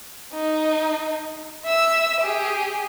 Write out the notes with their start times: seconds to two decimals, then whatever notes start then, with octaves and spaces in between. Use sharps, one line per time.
0.33 D#4
1.65 E5 E6
2.21 G4 G#4